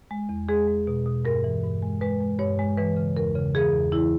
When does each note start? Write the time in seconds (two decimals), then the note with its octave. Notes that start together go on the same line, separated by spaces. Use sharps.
0.11 G#3
0.29 E2
0.49 G#3 G#4
0.68 G#3
0.87 B2
1.06 B2
1.25 G2 A#4
1.44 E3
1.63 G2
1.83 G#3
2.01 G#3 B4
2.20 G#3
2.39 G2 C#5
2.59 G#3
2.77 E3 B4
2.96 C#3
3.17 E2 A#4
3.35 C#3
3.54 E3 G#4
3.73 E2
3.92 E3 E4